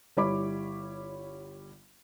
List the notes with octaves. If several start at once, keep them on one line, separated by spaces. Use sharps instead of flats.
G1 G3 E4 C#5 B5 D6